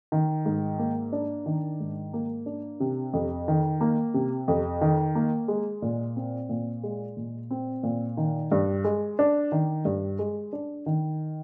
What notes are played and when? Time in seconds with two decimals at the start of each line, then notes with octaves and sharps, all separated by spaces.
0.12 D#3
0.46 G#2
0.79 A#3
1.12 D4
1.46 D#3
1.80 G#2
2.13 A#3
2.46 D4
2.80 C3
3.13 F2
3.48 D#3
3.81 A#3
4.14 C3
4.48 F2
4.81 D#3
5.15 A#3
5.48 G#3
5.82 A#2
6.16 C4
6.49 A#2
6.83 G#3
7.17 A#2
7.51 C4
7.83 A#2
8.17 D#3
8.52 G2
8.84 G#3
9.19 D4
9.52 D#3
9.85 G2
10.19 G#3
10.53 D4
10.86 D#3